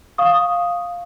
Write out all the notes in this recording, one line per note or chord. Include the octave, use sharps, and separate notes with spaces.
F5 C#6 D#6